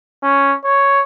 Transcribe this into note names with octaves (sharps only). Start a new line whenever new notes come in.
C#4
C#5